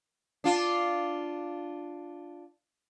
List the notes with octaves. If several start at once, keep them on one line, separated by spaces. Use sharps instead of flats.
D4 F4